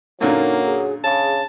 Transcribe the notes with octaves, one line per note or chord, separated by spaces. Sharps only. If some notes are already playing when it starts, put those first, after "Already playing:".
F#2 A#2 D3 F#3 A#3 D#4
G#4
C#3 G#4 A5